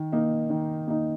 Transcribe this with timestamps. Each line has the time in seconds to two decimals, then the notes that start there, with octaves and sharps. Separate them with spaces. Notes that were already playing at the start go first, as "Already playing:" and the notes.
Already playing: D#3
0.12 A#3 D#4
0.50 D#3
0.88 A#3 D#4